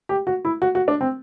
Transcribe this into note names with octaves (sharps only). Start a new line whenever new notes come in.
G4
F#4
E4
F#4
F#4
D4
C4